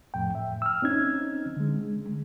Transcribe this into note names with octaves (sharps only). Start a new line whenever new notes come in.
F2 A2 G5
E5
E6 F6
C4 C#4 D#4 G#6
D3 G#3